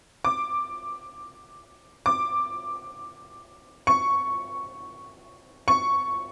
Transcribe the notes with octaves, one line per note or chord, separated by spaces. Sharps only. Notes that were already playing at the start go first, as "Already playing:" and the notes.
D6
D6
C#6
C#6